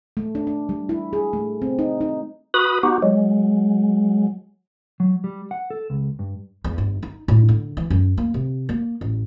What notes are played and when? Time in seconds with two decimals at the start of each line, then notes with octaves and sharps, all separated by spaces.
0.17 A3
0.35 D4
0.47 D4
0.69 G3
0.89 E4
1.13 G#4
1.33 A3
1.62 C4
1.79 D#4
2.01 D#4
2.54 F#4 B4 B5 D#6
2.83 B3 D#4 F#4 G4
3.03 F#3 G#3
5.00 F#3
5.24 G3
5.51 F#5
5.70 A4
5.90 C#2
6.19 G2
6.64 E2
6.78 G1
7.03 D#4
7.28 A2
7.49 D3
7.77 E3
7.90 F#2
8.17 A#3
8.34 C3
8.69 A#3
9.01 A1